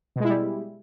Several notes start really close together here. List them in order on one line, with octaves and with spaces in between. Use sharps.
B2 G#3 E4 G3